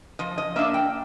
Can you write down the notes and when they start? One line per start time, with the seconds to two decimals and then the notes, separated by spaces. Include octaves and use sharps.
0.19 F3 D#5
0.38 D#5
0.56 A#3 D4 E5
0.74 G5